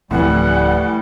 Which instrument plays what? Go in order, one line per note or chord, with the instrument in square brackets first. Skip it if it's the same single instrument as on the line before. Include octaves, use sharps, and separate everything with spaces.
[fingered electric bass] D1 F3 C4 [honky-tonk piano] A2 E3 [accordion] G3 [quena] F#5